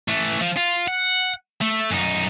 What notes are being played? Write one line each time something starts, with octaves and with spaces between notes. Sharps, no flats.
E3 A3
F3
F4
F#5
A3
F#2 D#4